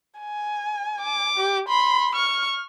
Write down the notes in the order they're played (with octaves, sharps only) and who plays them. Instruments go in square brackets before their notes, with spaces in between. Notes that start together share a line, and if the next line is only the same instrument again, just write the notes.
[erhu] G#5
[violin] D6
[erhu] G4
[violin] B5 [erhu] C6
[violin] C#6 [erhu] F6